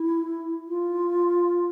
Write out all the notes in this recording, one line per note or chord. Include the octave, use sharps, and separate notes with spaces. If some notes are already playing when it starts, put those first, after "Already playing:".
Already playing: E4
F4